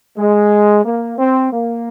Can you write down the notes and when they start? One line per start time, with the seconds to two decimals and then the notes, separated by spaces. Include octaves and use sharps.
0.17 G#3
0.84 A#3
1.18 C4
1.51 A#3